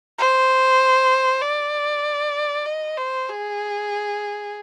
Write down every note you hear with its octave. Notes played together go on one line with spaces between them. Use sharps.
C5
D5
D#5
C5
G#4